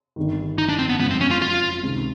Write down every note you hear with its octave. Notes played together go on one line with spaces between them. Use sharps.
G1 G2 D#3
D#4
D4
C4
B3
F#1 F2 C#3 F3 G#3 B3
C4
C#4
F4
F4
C#2 C3 D#3